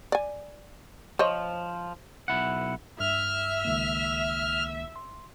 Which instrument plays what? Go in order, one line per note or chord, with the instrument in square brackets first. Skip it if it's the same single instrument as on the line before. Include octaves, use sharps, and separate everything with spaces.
[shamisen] D5 G#5
[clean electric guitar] F3 [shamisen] C5 C#5 D#5
[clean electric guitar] B1 E4 F#5
[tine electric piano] G2 [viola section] E5 [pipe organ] F6
[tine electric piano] C#2 D#3 A#3
C6